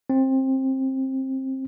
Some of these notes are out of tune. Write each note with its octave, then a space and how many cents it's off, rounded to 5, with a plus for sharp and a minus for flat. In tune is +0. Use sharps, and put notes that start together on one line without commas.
C4 +20